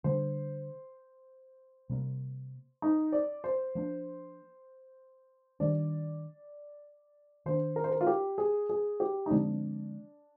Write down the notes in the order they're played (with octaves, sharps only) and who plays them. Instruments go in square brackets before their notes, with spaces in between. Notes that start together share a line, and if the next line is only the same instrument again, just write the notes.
[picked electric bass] D3 G3 D4 [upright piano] C5
[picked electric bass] C3 G3 A#3
[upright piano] D#4
D5
C5
[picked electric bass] F3 A#3 D4
[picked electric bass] D#3 G3 D4 [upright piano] D5
[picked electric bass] D#3 A#3 D4 [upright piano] C5
[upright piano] A#4
C5
A#4
F4
G4
G#4
G#4
G4
D#4
[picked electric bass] D3 F3 G#3 C4 [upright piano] D4